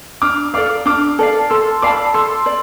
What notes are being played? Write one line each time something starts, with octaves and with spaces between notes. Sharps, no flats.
D4 D6 F6
A4 D5 F5 D6 F6
D4 D6 F6
A4 D5 F5
A4 C6 E6
D5 F5 A5 B5 D6
A4 C6 E6
D5